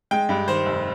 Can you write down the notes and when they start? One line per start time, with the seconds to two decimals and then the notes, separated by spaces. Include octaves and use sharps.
0.11 G#3 G5
0.29 G2
0.48 D#3 C5
0.66 F1